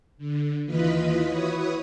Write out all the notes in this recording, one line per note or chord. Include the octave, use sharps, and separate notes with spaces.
D3
D#2 E3 F4 B4 D#5 B5
E4 F#4 B4 C#5 D#6